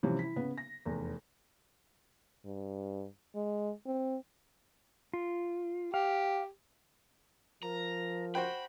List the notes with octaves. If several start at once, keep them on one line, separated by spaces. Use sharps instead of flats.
C3 E3 F3 G3 C#4
E4 B6
C#3 B3
A#6
F1 E2
G2
G#3
C4
F4
G4 F5
F3 A#4 A#5
F#4 C5 G5 B5